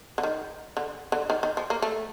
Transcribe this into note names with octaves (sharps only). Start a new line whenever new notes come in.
D3
D#3
D3
D3
D#3
D#3
F3
A#3
A3